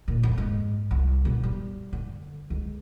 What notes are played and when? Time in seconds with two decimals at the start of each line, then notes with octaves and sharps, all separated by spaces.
0.08 A#2
0.23 F2
0.38 G#2
0.91 C2
1.25 B2
1.43 G3
1.93 D3
2.50 C#2